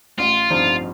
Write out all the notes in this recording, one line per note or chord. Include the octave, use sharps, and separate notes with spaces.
A1 F4
G2 F3 C4 D#4